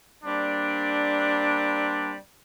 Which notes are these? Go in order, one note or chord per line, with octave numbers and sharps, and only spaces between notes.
G3 A#3 C4 D4